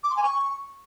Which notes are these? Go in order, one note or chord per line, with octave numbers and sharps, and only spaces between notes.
D6
C6
G#5
C#6